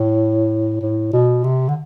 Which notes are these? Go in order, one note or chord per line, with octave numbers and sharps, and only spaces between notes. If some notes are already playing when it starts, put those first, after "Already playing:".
Already playing: A2
A2
B2
C3
D3